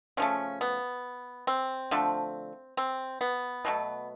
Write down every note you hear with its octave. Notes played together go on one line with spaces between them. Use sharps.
C#3 F3 A3 C#4
B3
C4
D3 F3 A3
C4
B3
B2 F#3 A3